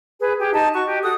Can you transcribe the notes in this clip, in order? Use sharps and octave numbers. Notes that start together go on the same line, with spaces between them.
G#4 B4
G4 G#4
D#4 D#5 A5
F#4 C#6
G4 D#5
F#4 A4 D#6